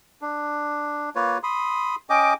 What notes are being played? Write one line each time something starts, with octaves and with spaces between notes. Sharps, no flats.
D4
A#3 F4 B4 C#5
B5 C6 D#6
C#4 D#5 G5 D6